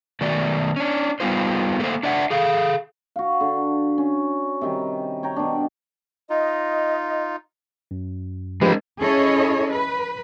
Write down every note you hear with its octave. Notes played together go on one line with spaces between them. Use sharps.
B2 D#3 A3 F#4 D5
C#4 D4
G3 B3 D#4 F4 C5
A3 A#3 C5
D4 D5 E5 F#5
G#4 A4 F5
F#4 F5
D3
C#4
C3 D#3 G3
C#5 G5 A#5
B2 D4
D#4 F4 D#5
F#2
F3 G#3 A3 C4 D4 G4 A#4 B4
C#4 E4 G#4 A4 C#5 D#5
B4